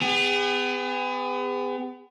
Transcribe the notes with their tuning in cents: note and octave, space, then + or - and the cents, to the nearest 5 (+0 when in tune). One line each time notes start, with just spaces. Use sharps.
B3 +35 G#4 -35